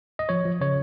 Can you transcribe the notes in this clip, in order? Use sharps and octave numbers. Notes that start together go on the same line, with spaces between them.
D#5
F3 C#5
F3
C#3 C#5